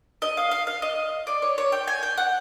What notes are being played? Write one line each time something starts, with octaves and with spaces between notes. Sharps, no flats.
D#5
F5
F5
F5
D#5
D5
C#5
C#5
G5
G#5
G5
F#5